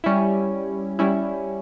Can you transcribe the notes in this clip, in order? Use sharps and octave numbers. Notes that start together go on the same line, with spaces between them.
G3 C#4 E4
G3 C#4 E4